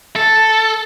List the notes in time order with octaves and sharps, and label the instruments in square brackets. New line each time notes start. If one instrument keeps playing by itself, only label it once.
[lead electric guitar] A4